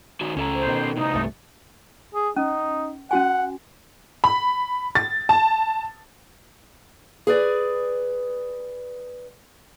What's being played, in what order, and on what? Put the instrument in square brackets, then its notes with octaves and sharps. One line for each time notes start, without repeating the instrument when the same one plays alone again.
[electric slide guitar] D#3 D#4 F#4
[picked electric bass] C#2 [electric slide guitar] C#4 A4 A#5
[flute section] C5
[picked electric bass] B2 D3 D#3
[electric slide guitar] A2 C3 [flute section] D#4 D#6
[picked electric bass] C2 G2 A3
[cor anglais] G#4
[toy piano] C#4 [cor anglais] D#4
[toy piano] C#4 F#4 G#5 [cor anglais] F#5
[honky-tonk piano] B5
A6
A5
[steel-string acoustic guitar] G#4 B4 D5